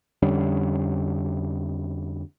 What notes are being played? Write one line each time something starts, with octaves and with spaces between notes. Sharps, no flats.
F2 D3 G3 C#4